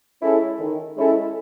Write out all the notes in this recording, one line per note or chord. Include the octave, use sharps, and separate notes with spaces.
G#3 C#4 E4 A4
D#3
G#3 C#4 E4 A4